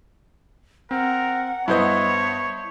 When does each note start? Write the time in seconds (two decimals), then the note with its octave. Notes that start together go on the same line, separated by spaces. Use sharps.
0.91 C4 A#4 F#5
1.68 G2 B3 E4 C5 C#5 D#5 G6